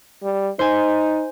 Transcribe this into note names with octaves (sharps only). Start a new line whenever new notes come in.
G3
D#4 C5 G#5